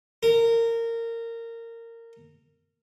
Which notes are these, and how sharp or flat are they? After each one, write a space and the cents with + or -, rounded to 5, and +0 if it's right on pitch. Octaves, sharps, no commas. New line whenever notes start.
A#4 -20